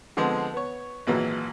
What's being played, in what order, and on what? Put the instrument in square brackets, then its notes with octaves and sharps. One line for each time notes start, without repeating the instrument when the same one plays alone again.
[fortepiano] D3 F3 G#3 B3 C4
B3 C#5
G#1 A#2 E3 F#3